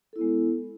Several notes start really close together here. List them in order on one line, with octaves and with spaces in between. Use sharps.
A4 E4 B3 G#3